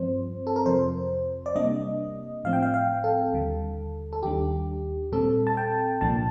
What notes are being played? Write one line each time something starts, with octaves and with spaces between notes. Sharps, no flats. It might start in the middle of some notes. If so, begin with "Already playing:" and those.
Already playing: G2 F3 C4 C5
A4
A#4
F2 C3 F3 C5
D5
C3 G3 A#3 D4 D#5
A2 F3 C4 F5
G5
F5
F5
A4
D#2 D3 G3
A4
D#2 D#3 G3 D4 G4
A#2 G3 C4 A4
A5
G5
C2 A#2 F3 A#3 D4 A5